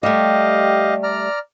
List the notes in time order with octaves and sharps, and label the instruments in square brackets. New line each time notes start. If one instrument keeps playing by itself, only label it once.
[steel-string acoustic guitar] G3 A3 [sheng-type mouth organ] G4 D#5 F5
[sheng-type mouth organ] D5 A#5 F6